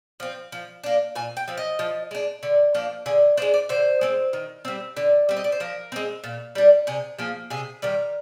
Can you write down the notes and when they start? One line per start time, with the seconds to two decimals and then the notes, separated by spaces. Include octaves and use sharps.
0.20 F3 C4
0.52 F3
0.84 A#3 D4
1.15 A#2 G#5
1.37 G5
1.48 F3 C4
1.57 D#5
1.79 F3
2.11 G#3 D4
2.43 D3
2.75 F3 A#3 D4
3.06 D3 G#4
3.37 D4 C5
3.42 G#3
3.54 D5
3.69 D3 C5
4.01 G#3 C4
4.33 D#3
4.65 G3 C4
4.97 D3
5.29 G3 C4
5.37 D#5
5.44 D5
5.52 C5
5.60 F3 A#4
5.92 G#3 C4
6.24 A#2
6.55 G3 D4
6.87 C3 G#4
7.19 F3 A#3 G#4
7.50 C3 G#4
7.82 D#3 G3 A#4